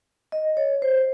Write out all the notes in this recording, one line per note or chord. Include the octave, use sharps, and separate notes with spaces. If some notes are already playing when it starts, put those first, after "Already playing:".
D#5
C#5
C5